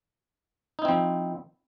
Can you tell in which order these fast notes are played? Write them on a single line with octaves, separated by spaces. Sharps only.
D#4 E4 C4 F3